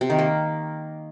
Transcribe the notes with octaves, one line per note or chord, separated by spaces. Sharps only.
C3
D#3
A#3